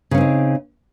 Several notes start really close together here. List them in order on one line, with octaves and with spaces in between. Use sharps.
C#3 C#4 C4 D#4